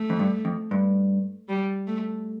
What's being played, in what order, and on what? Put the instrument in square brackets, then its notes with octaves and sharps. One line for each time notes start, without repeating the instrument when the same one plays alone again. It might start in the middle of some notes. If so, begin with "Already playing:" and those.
Already playing: [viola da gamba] A3
[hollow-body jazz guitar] F2
G2
F2
G2
[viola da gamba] G3
A3